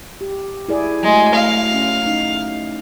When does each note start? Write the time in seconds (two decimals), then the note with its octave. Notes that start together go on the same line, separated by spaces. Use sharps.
0.21 G4
0.68 E4 G#4 D5
1.03 F#3 G#3 A3
1.34 A3 F5
1.74 C#4
2.06 D#4